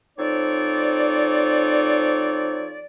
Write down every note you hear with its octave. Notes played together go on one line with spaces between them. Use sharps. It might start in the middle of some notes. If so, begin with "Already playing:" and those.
F3 C4 D#4 A4 C#5 D5